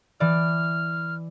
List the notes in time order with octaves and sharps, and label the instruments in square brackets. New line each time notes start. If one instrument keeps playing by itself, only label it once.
[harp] E3 D5 [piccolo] F6